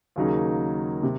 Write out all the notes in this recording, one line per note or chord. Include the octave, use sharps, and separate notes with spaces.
D#2 C#3 F#3 A#3 D#4
C3